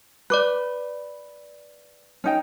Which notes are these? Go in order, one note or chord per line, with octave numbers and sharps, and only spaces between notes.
B4 D5 D6 F#6
C#4 D#4 G5